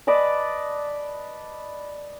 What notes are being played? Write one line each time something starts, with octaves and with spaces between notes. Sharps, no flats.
B4 D5 D#5 A5